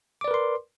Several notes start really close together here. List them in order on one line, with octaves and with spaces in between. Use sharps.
D6 D5 B4 A#4 C6